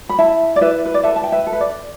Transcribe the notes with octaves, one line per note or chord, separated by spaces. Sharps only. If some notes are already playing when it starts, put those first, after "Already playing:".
B5
E4 E5 A5
D5
E4 B4 E5
B4
D5
A4 B4 E5
A5
G5
B4 E5
A4
B4
D5